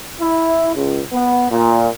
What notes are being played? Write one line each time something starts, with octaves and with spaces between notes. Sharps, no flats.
E4
C#2
B3
A#2